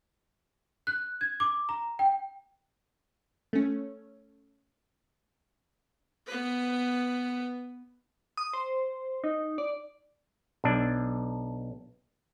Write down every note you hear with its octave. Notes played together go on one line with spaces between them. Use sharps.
F#6
G#6
D6
A#5
G5
A3 C#4
B3 B4
D#6
C5
D#4
D5
B1 D4